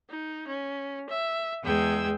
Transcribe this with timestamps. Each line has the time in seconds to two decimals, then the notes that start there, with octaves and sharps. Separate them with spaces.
0.10 D#4
0.48 C#4
1.10 E5
1.63 E2 G#3 G#4 G5 E6 G#6